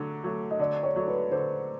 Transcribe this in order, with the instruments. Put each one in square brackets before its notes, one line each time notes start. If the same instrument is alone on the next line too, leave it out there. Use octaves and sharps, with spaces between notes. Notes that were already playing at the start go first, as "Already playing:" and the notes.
Already playing: [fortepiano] D3 F#3 A3
F#3 A3
[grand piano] D#5
[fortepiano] D3 [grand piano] D5
[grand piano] C#5
[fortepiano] F#3 A3
[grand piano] B4
[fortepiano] D3 [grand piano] C5